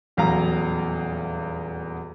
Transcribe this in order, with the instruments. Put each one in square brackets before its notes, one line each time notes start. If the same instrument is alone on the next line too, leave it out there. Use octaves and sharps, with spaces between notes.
[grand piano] D#1 E2 F#3 F5 A#5